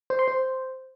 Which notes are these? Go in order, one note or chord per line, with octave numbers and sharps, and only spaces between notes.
C5
C6
C5